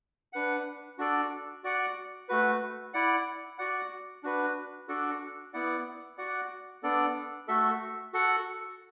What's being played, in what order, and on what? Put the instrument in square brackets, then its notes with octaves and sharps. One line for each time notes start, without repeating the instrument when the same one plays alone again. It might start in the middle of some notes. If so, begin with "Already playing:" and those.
[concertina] D4 B4 F#5
D4 F#4 A4 D5
F#4 D5 F#5
A3 F#4 B4
E4 D5 F#5
F#4 D5 F#5
D4 F#4 B4
D4 F#4 A4 D5
B3 E4 D5 F#5
F#4 D5 F#5
B3 D4 A4 D5
A3 F#4 A4 E5
F#4 A4 F#5